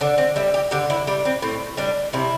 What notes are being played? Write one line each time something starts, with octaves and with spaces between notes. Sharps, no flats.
D3 D4
C4
G3 E4
G4
D3 G4
E4
G3 D4
C4
A2 C4
G3 D4
C3 E4